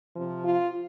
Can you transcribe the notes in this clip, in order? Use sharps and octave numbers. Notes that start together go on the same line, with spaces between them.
C3 F3
F4